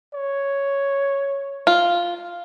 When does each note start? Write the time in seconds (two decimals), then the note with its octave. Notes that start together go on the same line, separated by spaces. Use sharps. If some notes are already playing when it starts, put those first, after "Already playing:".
0.14 C#5
1.67 F4